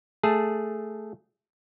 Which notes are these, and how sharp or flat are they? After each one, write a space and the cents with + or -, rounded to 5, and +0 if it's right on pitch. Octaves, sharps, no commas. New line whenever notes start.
A3 +0 G#4 +0 A5 +0